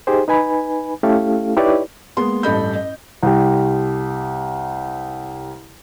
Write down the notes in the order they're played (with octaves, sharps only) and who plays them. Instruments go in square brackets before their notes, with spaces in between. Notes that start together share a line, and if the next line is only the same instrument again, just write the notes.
[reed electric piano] D#4 G4 G#4 C5
D#4 B4 G#5 B5
A3 C#4 E4 G4 A4 F5
D#4 E4 G4 B4 C#5 D5
[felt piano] G#3 A#3 B3 C6
A1 G2 A4 D#5 B5 G6
D#5
[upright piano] C2 G4